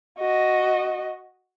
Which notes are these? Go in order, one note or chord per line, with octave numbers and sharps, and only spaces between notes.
F#4 D#5